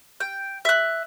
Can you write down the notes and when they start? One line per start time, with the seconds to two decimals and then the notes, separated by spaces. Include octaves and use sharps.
0.20 G5
0.65 E5 F#6